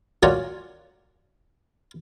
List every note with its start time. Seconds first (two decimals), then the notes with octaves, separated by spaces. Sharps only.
0.23 C#4 F4 F#4 A#4 C#5 D5